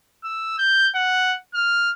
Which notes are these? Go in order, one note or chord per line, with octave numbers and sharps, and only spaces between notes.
E6
G6
F#5
F6